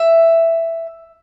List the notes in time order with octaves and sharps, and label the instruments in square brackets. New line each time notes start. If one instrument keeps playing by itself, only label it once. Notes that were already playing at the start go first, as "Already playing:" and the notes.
Already playing: [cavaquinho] E5